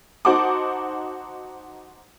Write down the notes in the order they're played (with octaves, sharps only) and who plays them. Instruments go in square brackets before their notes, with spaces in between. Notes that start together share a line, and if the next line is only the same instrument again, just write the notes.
[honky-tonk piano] D#4 F#4 C5 F#5 A5 D6